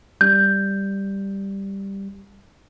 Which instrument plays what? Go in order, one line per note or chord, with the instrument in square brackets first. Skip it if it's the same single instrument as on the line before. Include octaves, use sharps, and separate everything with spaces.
[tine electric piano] G3 [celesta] G6